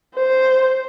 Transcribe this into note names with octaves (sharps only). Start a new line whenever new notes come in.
C5